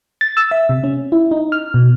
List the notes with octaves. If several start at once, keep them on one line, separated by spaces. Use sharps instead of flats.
A6
E6
E5
C3
C#4
E4
D#4
F6
B2